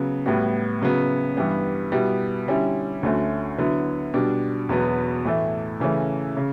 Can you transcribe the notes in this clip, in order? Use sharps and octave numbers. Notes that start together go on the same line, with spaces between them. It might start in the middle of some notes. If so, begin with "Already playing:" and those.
Already playing: C#3 F#3 B3
A2 G3 B3 F#4
C#3 F#3 B3
G2 E3 G3 B3
B2 G3 B3 E4
D3 G3 C#4 E4
D2 D3 A3 C#4 F#4
D3 F#3 B3 E4
B2 G3 D4
E2 B2 F#3 B3
A2 E3 A3
C#3 E3 A3 C#4
C#3